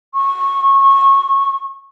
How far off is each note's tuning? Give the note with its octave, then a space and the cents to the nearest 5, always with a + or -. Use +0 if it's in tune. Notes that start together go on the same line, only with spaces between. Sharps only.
C#6 -20